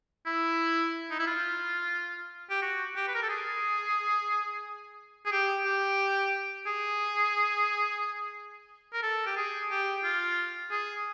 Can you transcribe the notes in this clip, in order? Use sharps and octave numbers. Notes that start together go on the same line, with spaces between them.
E4
D#4
E4
F4
G4
F#4
G4
B4
A#4
A4
G#4
G#4
G4
G4
G#4
A#4
A4
G4
G#4
G4
F4
G#4